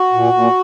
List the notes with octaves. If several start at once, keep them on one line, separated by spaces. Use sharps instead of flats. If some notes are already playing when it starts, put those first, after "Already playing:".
Already playing: F#4
A#2
A#2